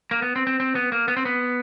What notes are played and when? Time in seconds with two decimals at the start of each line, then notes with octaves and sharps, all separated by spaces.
0.11 A#3
0.22 B3
0.36 C4
0.47 C4
0.60 C4
0.75 B3
0.92 A#3
1.08 B3
1.17 C4
1.25 B3